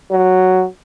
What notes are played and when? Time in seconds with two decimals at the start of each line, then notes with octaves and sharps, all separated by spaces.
0.12 F#3